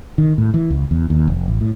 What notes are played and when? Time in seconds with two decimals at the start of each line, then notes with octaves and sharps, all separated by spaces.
0.18 D#3
0.38 A2
0.54 E3
0.70 C#2
0.91 E2
1.10 D#2
1.27 F1
1.48 A1
1.61 A2